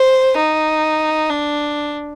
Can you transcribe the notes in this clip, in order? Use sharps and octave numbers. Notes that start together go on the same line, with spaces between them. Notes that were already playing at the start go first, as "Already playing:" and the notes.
Already playing: C5
D#4
D4